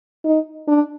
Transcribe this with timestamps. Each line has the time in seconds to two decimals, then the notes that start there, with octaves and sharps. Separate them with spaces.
0.25 D#4
0.68 D4